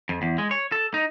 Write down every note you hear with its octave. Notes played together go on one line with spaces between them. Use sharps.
F2
E2
G#3
C#5
A4
D#4